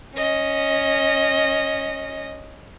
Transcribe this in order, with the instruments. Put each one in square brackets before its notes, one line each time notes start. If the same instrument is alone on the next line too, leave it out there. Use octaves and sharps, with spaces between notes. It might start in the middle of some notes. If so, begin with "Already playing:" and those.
[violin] C#4 D#5